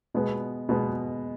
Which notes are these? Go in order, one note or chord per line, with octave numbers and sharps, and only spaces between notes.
B2 G#3 B3
B2 G#3 B3